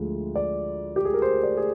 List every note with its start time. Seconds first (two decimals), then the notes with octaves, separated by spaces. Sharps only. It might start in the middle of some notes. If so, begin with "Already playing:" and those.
Already playing: D2 D3 F3 G#3
0.36 D5
0.96 G4
1.05 G#4
1.14 A#4
1.22 C5
1.43 D5
1.57 G#4